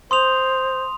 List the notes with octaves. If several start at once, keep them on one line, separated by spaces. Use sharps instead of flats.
C5 C6 D#6 F7